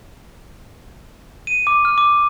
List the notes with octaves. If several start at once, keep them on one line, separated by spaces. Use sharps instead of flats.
D#7
D6
F6
D6